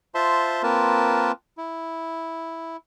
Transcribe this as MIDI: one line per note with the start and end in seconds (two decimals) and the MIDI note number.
0.15 0.62 65
0.15 0.62 72
0.15 0.62 76
0.15 0.62 81
0.15 0.62 84
0.63 1.32 58
0.63 1.32 60
0.63 1.32 65
0.63 1.32 70
0.63 1.32 71
0.63 1.32 81
1.58 2.77 64